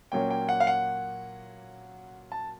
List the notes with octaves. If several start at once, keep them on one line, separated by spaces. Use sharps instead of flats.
A#2 F#3 A#3 C#4 G5
G5
F#5
F5
F#5
A5